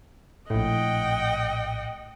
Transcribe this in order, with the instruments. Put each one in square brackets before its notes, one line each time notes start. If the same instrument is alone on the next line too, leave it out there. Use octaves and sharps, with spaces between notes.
[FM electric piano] A#1 A2 [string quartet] D#5 F#5 G5